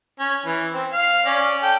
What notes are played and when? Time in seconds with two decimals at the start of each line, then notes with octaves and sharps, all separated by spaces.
0.19 C#4
0.46 E3
0.74 C4
0.92 F5
1.25 C#4 D5
1.63 A4 G5